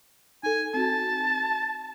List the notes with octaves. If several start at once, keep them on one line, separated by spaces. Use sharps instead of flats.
D#4 A4 G#5
C4 F#4 A5